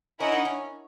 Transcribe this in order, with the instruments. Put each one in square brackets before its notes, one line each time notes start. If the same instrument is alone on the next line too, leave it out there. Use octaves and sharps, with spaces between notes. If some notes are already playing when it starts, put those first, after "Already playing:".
[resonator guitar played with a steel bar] C#4 [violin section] E4 A#4 D#5 F#5
[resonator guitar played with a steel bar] D#4
C#4